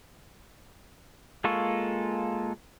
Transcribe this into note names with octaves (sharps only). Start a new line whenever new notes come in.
G#3 A#3 F4 A4 C#6